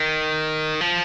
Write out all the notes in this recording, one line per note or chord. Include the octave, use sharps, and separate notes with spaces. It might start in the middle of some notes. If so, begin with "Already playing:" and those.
Already playing: D#3
F3